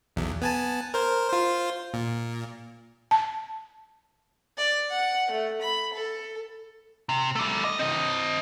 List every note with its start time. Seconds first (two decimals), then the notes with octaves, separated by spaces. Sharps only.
0.16 B1 E2
0.41 B3 G#5 A5
0.94 A#4 C5
1.30 F4 C5
1.94 A#2
3.11 A5
4.58 D5
4.90 F#5
5.31 A3
5.61 B5
5.94 A4
7.09 C3
7.35 G3 A3
7.64 D#5
7.79 C4 D#5